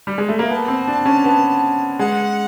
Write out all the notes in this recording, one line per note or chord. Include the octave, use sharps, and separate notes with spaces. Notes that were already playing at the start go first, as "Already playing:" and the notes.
G3
G#3
A3
A#3
B3 A5
C4
D4
C#4
B3
G#3 F#5